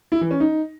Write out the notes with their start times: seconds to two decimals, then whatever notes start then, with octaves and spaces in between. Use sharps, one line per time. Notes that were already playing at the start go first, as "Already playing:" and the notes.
0.12 E4
0.21 E3
0.31 C#4
0.40 D#4